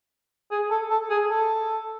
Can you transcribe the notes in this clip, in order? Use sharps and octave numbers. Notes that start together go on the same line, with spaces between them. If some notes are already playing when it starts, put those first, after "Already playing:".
G#4
A4
A4
G#4
A4